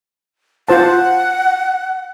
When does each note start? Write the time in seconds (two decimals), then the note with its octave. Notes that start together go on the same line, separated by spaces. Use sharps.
0.69 F4 C5 F#5 A5